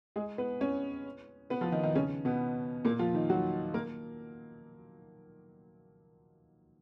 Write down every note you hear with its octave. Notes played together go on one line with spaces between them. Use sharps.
G#3 G#4
B3 B4
C#4 C#5
B3 B4
F3 F4
D#3 D#4
D#3 D#4
C#3 C#4
B2 B3
A#2 A#3
F3 F4
D#3 D#4
F#3 F#4
A#3 A#4